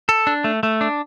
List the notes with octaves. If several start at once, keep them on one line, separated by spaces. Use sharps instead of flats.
A4
D4
A3
A3
D4